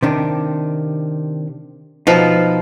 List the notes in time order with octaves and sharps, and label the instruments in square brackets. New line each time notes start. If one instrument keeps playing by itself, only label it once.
[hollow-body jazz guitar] C3 D#3 D4
[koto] B2 F3 F4 [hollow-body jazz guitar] D#4